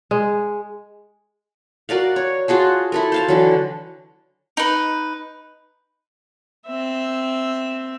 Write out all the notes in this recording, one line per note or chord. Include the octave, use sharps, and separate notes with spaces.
G#3
F#4 A#4 D5 F5
C#5
F4 F#4 G#4 A5
E4 A4 A#4
C5 F5 A5
D3 E3 F#3
D#4 B4
C4 E5